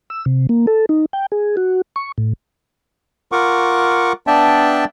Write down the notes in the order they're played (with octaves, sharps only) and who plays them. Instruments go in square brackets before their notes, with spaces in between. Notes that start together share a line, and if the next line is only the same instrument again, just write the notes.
[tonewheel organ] E6
C3
A#3
A4
D#4
G5
G#4
F#4
C#6
A2
[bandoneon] F4 A#4 F#5 C#6 D6
B3 D4 D5 E5 G5 A5